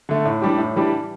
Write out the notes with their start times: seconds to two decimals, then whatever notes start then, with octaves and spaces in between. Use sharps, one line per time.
0.09 D3 A3
0.25 A2
0.42 E3 G3 D4 G4
0.58 A2
0.76 E3 G3 D4 G4